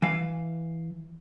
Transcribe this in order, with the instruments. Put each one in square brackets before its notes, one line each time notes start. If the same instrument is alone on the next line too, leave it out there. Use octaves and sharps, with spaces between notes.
[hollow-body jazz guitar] E3 F5